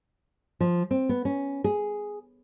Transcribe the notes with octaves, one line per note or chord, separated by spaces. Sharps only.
F3
C4
B3
C#4
G#4